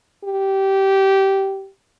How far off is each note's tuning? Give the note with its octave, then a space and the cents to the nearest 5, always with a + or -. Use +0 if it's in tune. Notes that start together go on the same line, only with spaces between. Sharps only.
G4 -15